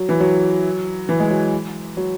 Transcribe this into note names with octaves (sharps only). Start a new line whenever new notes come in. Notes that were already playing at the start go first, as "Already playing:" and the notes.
Already playing: F#3
E3
F#3
E3
G#3
F#3
F#3